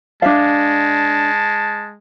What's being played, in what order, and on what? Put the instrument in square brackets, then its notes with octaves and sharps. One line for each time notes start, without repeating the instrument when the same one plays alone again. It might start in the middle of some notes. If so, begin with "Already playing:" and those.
[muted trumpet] G#3 [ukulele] D4 E5 F5 [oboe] A5